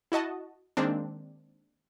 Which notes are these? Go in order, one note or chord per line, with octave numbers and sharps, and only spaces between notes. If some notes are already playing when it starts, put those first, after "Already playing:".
E4 F#4 D#5 A5
D#3 G#3 A#3 C4 D4